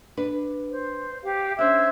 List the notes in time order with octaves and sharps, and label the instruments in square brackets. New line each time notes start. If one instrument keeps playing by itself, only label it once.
[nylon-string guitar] D4 B4
[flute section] C5
G4 F5
[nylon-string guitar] C#4 D4 [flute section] C5 F#6 G#6 [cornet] E5